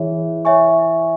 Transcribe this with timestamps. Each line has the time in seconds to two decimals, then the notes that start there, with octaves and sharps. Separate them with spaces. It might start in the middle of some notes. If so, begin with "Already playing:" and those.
Already playing: E3 G#4 C#5 E5
0.45 C#5 E5 G#5 C#6